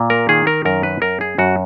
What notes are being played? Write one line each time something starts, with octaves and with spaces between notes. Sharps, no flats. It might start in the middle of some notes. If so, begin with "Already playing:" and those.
Already playing: A#2
A#4
D#3 G#4
A#4
F#2 A#4
B4
F#2 A#4
G#4
F#2 F#4